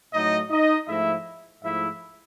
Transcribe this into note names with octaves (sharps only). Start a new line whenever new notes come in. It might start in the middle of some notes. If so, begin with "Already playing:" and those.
A2 F#3 A3 D#4 D#5
D#4 D#5
G#2 F3 A3 E4 E5
G#2 F3 A3 E4 E5